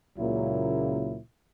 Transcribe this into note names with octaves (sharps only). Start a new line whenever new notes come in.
C#2 A#2 C#3 F#3 A#3 E4